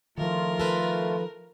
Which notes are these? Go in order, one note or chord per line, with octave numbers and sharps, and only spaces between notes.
D#3 F3 A3 F4 A#4
A4 B4